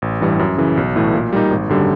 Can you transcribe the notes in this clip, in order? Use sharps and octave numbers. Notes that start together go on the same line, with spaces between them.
A1
G2 E3 G3
F#2
C#3 E3
B1
A2 E3 A3
A#2
G3 A#3 D#4
G#1
F#2 D3 G3